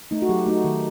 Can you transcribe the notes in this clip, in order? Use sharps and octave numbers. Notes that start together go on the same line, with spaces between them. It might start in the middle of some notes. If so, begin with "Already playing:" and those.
A3 D#4
F#4
F#3 G4
A3 D#4
D#3